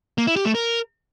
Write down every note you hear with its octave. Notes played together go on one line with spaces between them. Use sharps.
A#3
E4
G4
A3
A#4